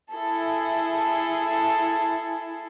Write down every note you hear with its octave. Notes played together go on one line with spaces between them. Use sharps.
E4 G#4 A4